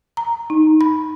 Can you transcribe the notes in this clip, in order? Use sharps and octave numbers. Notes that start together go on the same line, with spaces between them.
A#5
D#4
B5